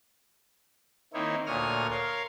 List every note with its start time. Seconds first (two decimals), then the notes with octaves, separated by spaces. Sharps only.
1.14 D#3 A#3 C4 D#4 E4 C#5
1.46 D2 A#2 C#5 D#6 F6
1.90 A#4 C#5 F5 C6